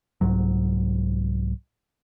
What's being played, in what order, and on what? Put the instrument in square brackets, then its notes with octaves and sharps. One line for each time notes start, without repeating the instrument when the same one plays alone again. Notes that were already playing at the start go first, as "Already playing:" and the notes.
[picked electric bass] C2 G#2 F#3